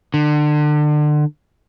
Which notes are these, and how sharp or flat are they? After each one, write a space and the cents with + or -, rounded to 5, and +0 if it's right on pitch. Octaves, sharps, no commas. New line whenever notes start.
D3 +30